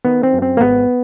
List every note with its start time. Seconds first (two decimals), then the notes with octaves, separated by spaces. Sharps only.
0.05 D#3 B3
0.23 C4
0.33 F#2
0.42 C4
0.57 A#3
0.61 G#1 B3